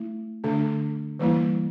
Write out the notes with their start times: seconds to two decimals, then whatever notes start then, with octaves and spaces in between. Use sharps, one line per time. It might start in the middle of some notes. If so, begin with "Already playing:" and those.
Already playing: A3 E4
0.44 D3 A3 D4
1.19 E3 G3 A#3 E4